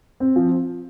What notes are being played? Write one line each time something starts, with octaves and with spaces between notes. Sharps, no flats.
C4
F3